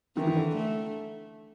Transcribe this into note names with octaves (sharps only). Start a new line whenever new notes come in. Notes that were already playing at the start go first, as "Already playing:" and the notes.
D#3 E3
D#3
D3
A3